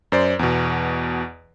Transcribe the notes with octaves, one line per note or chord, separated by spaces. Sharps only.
F#2 C5 D5
E2 B2